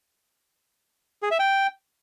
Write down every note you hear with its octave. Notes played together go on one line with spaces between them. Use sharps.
G#4
E5
G5